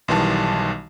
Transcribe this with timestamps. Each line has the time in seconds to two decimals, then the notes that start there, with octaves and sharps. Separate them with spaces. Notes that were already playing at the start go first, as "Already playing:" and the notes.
0.08 B1 D#3 E3 G3 A5